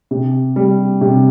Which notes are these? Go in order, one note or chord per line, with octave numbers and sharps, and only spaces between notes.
C3
G3
C3